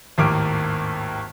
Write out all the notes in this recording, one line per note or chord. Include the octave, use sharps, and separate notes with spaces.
G#1 D#2 A2 A#3 D6 F6